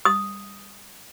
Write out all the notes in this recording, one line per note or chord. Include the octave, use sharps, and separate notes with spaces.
D#6